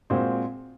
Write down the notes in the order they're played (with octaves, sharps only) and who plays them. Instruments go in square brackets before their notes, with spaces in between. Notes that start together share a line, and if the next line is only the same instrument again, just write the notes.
[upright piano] A#2 G#3 C4 F#4 C5